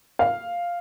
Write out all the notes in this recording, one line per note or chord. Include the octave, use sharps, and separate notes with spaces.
F5